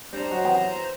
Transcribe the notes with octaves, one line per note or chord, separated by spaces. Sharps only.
G3 D4 C5 A#5
F#3 F#4 D#5
C3 E3 B3